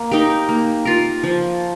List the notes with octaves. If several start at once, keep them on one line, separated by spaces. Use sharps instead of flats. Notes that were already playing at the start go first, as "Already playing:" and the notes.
Already playing: A#3
D#4 G4 A#4
A#3
F4 A#4
F3